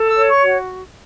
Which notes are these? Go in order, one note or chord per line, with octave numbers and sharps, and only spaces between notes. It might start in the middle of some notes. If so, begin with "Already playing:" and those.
Already playing: A4
E6
C#5
C#6
F#4